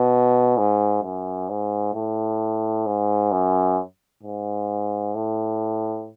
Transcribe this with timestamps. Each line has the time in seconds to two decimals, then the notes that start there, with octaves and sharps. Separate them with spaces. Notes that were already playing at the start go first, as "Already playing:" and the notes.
Already playing: B2
0.58 G#2
1.04 F#2
1.50 G#2
1.94 A2
2.87 G#2
3.32 F#2
4.23 G#2
5.14 A2